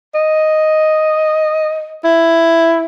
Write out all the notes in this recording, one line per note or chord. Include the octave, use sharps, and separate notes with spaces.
D#5
E4